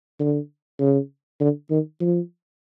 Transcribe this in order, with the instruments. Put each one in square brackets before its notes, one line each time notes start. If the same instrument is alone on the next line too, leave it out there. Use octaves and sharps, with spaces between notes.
[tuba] D3
C#3
D3
D#3
F3